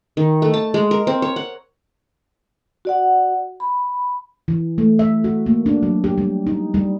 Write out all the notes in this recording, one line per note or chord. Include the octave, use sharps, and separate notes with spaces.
D#3
A3
A5
G#3
A#4
C4
C#5
F#5
F#4 D5 F#5
B5
E3
A3
E5
F#4
A#3
D4
F#3
G4
G3
D#4
G3